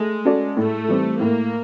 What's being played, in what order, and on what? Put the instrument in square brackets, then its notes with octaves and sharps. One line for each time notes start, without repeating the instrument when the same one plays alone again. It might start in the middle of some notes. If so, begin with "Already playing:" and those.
Already playing: [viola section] G#3 [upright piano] A3
[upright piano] C#4 F#4 A4 D5
[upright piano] A2 [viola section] A3
[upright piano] E3 G3 C4
[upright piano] A2 [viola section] A#3